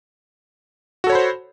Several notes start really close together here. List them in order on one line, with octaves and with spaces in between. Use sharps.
F#4 A4 C#5 B5 C5